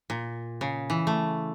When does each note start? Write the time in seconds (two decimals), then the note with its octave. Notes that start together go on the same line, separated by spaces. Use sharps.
0.10 A#2
0.61 C#3
0.90 E3
1.07 A3